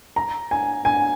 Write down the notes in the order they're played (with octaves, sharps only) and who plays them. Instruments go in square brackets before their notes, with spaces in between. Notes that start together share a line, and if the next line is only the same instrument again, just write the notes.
[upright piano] A#5
G#5
G#5